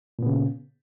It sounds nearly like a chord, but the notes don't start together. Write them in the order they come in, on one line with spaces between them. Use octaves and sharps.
A#2 B3 C#3